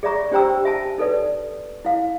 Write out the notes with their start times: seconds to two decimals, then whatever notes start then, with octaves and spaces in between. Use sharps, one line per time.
0.03 G#4 D5 E5 A#5 C#6
0.31 D4 G4 C5 G5 A#5 E6
0.65 E5 G#5 A5
0.98 D#4 A4 B4 D5
1.85 E4 F5